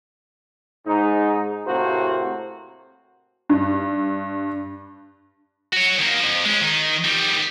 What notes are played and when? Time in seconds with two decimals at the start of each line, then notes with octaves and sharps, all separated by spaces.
0.85 G#2 D#4
1.66 A2 C3 A#3 F#4 C5
3.49 G2
5.73 F#4 C#5
5.99 D#3 A#3
6.20 F2 F3
6.45 G#3 C#4
6.62 D#3 D#4
7.04 D#3 G3